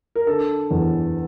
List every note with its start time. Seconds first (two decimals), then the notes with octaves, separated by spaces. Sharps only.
0.15 A#4
0.27 D3 A4
0.71 E2